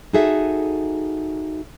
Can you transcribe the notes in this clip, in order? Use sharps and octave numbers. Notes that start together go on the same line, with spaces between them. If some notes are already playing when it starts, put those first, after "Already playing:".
D#4 F#4 G#4 A4 E5